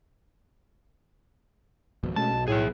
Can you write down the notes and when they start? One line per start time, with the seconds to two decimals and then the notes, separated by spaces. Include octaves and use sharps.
2.03 G#1 F2 B2
2.16 B2 G#3 A3 C#4 A5
2.32 B1
2.48 A2 G#4 E5